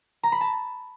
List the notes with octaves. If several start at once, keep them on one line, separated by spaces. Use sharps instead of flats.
A#5
B5
A5